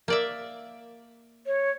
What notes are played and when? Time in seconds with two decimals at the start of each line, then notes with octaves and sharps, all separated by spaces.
0.08 A#3 D5 E5
1.46 C#5